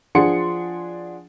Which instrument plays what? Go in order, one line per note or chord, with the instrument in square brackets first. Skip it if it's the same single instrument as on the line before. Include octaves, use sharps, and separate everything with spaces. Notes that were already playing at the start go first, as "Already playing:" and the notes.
[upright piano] F3 D4 G#4 F#5 C6 C#7